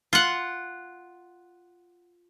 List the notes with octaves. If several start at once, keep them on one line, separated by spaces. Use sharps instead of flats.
F4 F#5